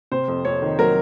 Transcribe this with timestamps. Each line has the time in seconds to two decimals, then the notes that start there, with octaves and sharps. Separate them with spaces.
0.12 C3 C5
0.28 F2
0.45 F2 C#5
0.62 D#3
0.79 F#3 A#4